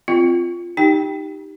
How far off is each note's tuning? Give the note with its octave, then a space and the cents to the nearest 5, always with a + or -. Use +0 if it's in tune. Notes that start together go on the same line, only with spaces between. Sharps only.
C4 -5 F4 -10
D#4 +0 G4 +0 G5 +0